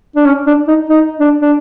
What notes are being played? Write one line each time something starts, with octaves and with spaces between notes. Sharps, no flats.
D4
C#4
D4
D#4
D#4
D4
D4